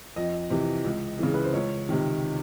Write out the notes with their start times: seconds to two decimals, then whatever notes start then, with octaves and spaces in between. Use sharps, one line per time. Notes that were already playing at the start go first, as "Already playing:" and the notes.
0.16 F2 D#5
0.50 C3 E3
0.84 C#2
1.19 C#3 E3
1.34 B4
1.45 C5
1.54 C#2 C#5
1.89 C3 D#3